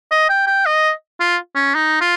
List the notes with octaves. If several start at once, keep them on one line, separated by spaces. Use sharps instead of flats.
D#5
G5
G5
D#5
F4
C#4
D#4
F4